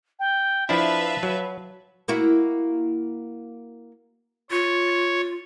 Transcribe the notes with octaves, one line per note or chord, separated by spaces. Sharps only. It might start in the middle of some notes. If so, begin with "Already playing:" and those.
G5
F3 D4 E4 B4 E5 F5 A5
F#3
A#3 E4 F#4
F4 C#5